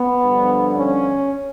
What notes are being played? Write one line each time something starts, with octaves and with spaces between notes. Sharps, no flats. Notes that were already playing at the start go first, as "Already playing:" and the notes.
Already playing: B3
G2 D3 F3
C#4